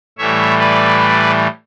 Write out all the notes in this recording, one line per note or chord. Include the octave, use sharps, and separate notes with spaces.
A2 E3 G3 C#5 E5
B4 D5